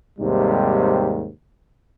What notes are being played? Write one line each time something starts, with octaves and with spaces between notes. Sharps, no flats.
D#2 G#2 C3 G3